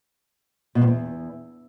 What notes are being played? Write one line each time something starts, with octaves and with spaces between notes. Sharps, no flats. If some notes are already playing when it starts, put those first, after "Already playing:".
B2
G2
E2